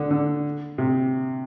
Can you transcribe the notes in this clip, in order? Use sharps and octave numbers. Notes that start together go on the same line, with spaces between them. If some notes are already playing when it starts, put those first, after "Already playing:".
Already playing: D3
D3
C3